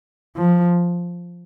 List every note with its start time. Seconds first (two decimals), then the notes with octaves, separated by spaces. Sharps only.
0.37 F3